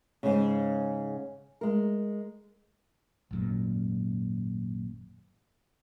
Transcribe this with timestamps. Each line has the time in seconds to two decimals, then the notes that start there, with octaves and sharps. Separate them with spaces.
0.23 G#2 C#3
1.61 G#3 A#4
3.31 G#1 F#2 A#2